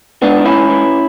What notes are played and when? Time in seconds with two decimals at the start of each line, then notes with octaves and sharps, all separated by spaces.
0.22 G#2 B3 D4
0.38 E3
0.45 C#4 E4
0.53 G#2
0.70 E3